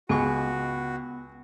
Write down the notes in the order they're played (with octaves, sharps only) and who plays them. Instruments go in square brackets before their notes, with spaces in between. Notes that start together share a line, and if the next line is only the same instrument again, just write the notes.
[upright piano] C#2 [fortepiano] G#3 C#6 [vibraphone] B3 [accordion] F#4